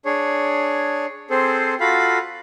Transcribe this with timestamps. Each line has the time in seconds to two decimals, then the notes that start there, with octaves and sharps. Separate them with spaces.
0.05 D4 G#4 C#5
1.30 C4 G#4 A4 C5
1.80 F4 F#4 A4 F5 B5